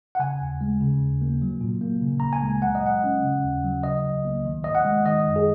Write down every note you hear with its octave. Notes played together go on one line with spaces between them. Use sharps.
F#5
C#3 G#5
D#2
G#3
C#3
D#2
A#3
F#3
A#2
A#3
C#3
C#2 A#5
G#5
G#3
F#3 F#5
D#5
A#2 F#5
C#4
C#3
D#2
F#3
C#3 D#5
C#2
A#3
D#3
G#2 D#5
F#5
G#3
D#3 D#5
F#2
G#4